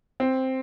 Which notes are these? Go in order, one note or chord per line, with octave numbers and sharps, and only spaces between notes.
C4